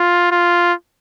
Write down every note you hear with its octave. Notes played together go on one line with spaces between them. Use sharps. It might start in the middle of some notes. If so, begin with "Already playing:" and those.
Already playing: F4
F4